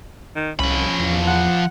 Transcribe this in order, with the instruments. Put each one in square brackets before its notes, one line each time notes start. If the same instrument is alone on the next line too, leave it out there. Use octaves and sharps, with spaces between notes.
[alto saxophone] D#3
[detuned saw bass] C2 [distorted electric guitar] F3 B5 [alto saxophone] C#4
[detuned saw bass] E2
[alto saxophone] F#5